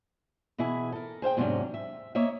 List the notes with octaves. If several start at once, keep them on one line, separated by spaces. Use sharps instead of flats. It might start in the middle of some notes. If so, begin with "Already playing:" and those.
B2 E3 E4 G#4
A4 A#4
G#4 C5 F5 G5
E2 G#2 C3 F#3 C#4 D4
E5
A#3 C#5 D#5 E5